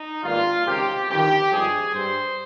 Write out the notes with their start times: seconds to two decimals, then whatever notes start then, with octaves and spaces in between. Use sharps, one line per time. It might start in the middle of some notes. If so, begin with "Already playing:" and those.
Already playing: D#4
0.23 G#1 G2 G3 A#3 F4
0.66 C#2 C3 D#3 G4
1.08 G1 F2 C3 D#3 G4
1.51 G2 F3 G#3 C4 G#4
1.93 G2 G3 C4 C5